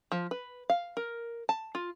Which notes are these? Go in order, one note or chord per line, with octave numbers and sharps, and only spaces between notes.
F3
B4
F5
A#4
A5
F4